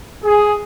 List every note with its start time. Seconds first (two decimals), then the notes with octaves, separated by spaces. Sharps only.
0.25 G#4